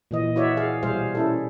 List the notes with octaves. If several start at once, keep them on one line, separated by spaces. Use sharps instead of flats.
A#2 E3 D#5
E4 F#4 C#5 D5 E5
G#4 F5
B2 G3 G#4 C5 F5
C#4 E4 A4